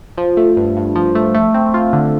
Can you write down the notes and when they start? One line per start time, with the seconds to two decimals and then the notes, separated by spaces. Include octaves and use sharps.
0.18 F3
0.37 A3
0.57 G2
0.77 G2
0.95 F3
1.15 A3
1.34 A3
1.54 C4
1.74 F4
1.93 D3